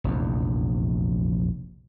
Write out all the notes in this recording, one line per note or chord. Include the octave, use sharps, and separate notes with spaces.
F1 A#1 E2